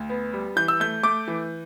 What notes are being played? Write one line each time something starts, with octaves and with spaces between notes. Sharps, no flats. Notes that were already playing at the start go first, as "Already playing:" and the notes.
Already playing: D2
B3
G3
E3 G6
E6
A3 G6
A3 D6
E3